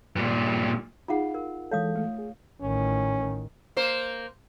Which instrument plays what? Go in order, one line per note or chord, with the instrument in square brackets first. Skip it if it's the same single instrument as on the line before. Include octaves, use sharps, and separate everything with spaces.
[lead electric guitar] G2 A#2
[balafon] D#4 G#4 [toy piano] F4 F5 F#5
[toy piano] A#4
[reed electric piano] E3 G#3 A4 [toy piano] C#5 F5 D#6
[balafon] A3
[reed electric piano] G#4
[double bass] A1 D#3 [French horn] C#4
[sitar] A#3 C5